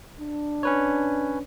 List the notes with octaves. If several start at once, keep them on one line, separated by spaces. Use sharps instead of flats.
D4
C#4 B4 C#5